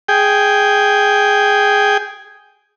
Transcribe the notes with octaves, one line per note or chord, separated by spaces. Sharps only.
G#4 G5